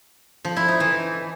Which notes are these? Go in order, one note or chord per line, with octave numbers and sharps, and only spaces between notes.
F3
E4
D#4
E3